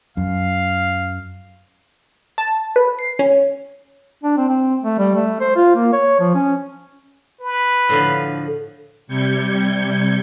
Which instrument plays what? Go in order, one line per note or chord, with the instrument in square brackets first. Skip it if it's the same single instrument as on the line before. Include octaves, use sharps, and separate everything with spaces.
[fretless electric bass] F#2 [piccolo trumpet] F5
[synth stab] A5
B4
C7
C#4
[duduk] D4
C4
C4
A3
G3
A3
C5
F4
A#3
C#5
F3
C#4
[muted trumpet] B4
[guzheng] A2 D3 F3
[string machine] C3 G3 G6 G#6 C#7